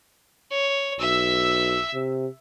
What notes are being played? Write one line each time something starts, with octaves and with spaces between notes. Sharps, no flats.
C#5
B1 E5 E6
C3